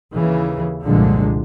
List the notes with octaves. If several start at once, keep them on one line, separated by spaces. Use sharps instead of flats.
D#2 C#3 E3
C2 F#2 A#2 D3 F3 G#3